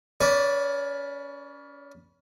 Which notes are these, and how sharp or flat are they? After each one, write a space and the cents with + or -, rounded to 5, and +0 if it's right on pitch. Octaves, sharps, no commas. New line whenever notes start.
C#4 +30 B4 -20 D5 +0